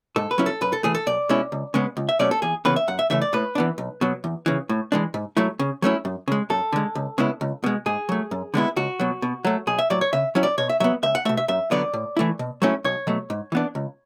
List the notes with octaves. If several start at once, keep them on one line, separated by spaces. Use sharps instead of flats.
G#2 A4
B4
F#3 C#4 E4
A4
F#2 B4
A4
E3 A3 G#4
A4
B1 D5
B2 G#3 C#4 E4
C#2
C#3 G#3 B3
C#2
E5
B2 F#3 A3 C#4 D5
A4
E2 G#4
C#3 E3 B3 B4
E5
F#2 F#5
E5
C#3 E3 A3 E5
D5
A2 B4
E3 B3 D4
B1
B2 F#3
E2
C#3 E3
A2
E3 G#3 D4
G#2
F#3 A3 E4
C#3
F#3 A3 C#4 E4
F#2
C#3 G#3
F#2 A4
D3 G#3
C#2
C#3 G#3 B3 E4
C#2
B2 G#3
G#2 G#4
F#3 A3
F#2
D3 G#3 B3 E4
C#2 F#4
B2 F#3
B2
F#3 A3
B1 G#4
E5
A2 F#3 D5
C#5
C#3 E5
F#3 C#4 E4
D5
B2 C#5
E5
F#3 B3 E5
C#2 E5
F#5
B2 A3 E5
E5
F#2 E5
D3 F#3 B3 D5
A2
E3 A3 E4
B2
F#3 A3 C#4 E4
B1 C#5
B2 F#3 A3
G#2
E3 B3 D4
C#2